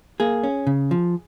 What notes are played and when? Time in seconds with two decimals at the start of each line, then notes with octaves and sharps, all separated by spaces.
0.20 A#3 G#4
0.43 C#4
0.67 C#3
0.91 F3